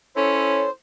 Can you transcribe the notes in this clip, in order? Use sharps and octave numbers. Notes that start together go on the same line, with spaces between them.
C#4 E4 A4 C5 C#5